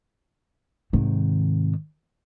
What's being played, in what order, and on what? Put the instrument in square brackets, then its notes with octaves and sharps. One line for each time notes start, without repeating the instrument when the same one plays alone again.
[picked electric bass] G#2 C3 [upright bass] D#3